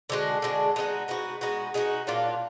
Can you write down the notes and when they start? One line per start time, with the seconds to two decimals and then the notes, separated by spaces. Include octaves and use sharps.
0.10 D3 G#3 D4 F#4
0.42 D3 G#3 D4 F#4
0.76 G#3 B3 D#4 F#4
1.08 G#3 B3 D#4 F#4
1.41 G#3 B3 D#4 F#4
1.74 G#3 B3 D#4 F#4
2.07 A#2 F#3 D4 F4